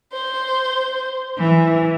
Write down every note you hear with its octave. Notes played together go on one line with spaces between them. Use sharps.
C5
E3